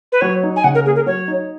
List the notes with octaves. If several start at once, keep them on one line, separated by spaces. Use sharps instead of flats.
B4
F#3 C#5
D#4
G#5
C#3 F#5
A#4
A#3 G#4
A#4
F#3 C#5
D#4